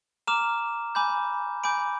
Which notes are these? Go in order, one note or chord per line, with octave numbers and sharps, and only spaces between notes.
A#5 D6 F6 E7
G#5 B5 D6 G6
G#5 B5 D6 G6 D7